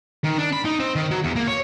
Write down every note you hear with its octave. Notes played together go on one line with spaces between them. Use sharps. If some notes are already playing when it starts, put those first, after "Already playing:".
D#3
D4
B5
D#4
C4
D#3
F#3
E2
A#3
C#5